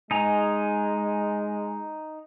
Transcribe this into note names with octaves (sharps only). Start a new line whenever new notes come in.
G#3 D#4 G#5 A#5